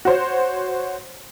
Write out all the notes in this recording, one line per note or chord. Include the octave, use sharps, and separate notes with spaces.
F#4 C5 C#5